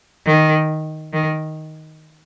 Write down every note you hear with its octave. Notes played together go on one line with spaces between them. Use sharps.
D#3
D#3